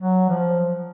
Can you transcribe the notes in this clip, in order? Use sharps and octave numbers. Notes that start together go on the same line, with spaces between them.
F#3
F3